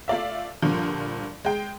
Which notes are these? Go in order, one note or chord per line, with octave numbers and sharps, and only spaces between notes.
A3 F4 D5 E5
G2 A#2 D3 F3
G#3 G5